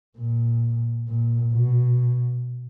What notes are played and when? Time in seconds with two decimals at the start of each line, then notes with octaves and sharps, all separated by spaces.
0.18 A#2
1.08 A#2
1.53 B2